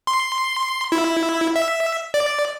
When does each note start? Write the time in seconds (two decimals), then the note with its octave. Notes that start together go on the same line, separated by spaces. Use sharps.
0.07 C6
0.92 E4
1.56 E5
2.14 D5